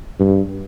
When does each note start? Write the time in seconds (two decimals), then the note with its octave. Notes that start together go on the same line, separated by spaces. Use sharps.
0.19 G2